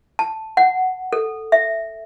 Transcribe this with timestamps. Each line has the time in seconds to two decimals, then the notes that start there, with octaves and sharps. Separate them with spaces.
0.19 A5
0.57 F#5
1.13 A4
1.52 E5